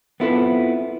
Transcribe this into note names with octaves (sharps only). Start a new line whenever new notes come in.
B3 C4 E4 F4 A4 B4